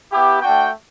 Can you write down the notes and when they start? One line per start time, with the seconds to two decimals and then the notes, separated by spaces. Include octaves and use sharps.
0.12 B3 E4 G4
0.41 A3 D4 F#4 G5